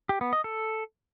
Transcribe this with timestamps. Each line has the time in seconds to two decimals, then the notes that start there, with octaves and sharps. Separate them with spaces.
0.09 G4
0.21 B3
0.33 D#5
0.44 A4